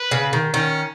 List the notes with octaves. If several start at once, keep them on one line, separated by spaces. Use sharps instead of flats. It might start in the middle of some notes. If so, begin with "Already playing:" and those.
Already playing: B4
C#3
D#3
D#3 C#4